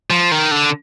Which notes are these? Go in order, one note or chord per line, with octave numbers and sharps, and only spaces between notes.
F3
D#3
D3